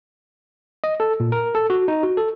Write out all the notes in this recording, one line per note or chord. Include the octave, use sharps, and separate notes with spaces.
D#5
A4
A#2
A#4
A4
F#4
D#4
F#4
A4